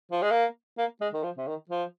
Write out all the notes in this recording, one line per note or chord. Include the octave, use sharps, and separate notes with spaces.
F3
G#3
A#3
A#3
G#3
D#3
F3
C3
D#3
F3